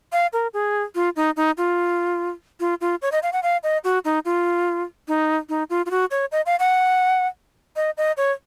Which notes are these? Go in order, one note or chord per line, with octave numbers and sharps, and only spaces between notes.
F5
A#4
G#4
F4
D#4
D#4
F4
F4
F4
C#5
D#5
F5
F#5
F5
D#5
F#4
D#4
F4
D#4
D#4
F4
F4
F#4
C#5
D#5
F5
F#5
D#5
D#5
C#5